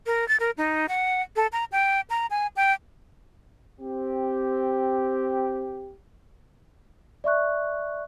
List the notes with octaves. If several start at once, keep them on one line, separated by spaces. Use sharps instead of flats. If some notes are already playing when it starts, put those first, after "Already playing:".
A#4
A6
A#4
D#4
F#5
A4
A#5
G5
A#5
G#5
G5
C4 G4
D5 E5 C#6 F#6